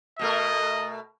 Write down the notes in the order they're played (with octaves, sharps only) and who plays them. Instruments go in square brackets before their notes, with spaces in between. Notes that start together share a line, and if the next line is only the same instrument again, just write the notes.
[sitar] B2 A3 A#4 [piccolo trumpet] D#5